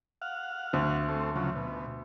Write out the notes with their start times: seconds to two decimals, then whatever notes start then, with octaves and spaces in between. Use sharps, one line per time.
0.22 F5 F#5
0.73 D2
1.09 A3 C4
1.36 C#3 F3 F#3
1.56 B2